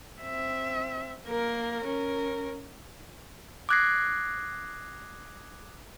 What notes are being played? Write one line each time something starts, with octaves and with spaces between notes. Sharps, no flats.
C4 E5
A#3 A#4
C#4 A#4
D6 D#6 F#6 G#6 A#6 C7